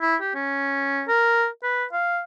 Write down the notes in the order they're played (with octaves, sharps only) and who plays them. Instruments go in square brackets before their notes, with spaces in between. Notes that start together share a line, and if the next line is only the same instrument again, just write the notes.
[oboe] E4
G4
C#4
A#4
B4
F5